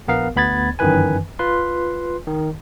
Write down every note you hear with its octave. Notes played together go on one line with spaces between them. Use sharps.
A#1 B3 A#4 F5
D2 B3 B5 G#6 A6
G1 F#2 D#3 E3 B4 G#5
F4 B4 C6
D#3